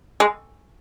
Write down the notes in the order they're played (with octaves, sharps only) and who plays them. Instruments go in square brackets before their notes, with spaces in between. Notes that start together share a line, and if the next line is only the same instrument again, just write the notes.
[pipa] G#3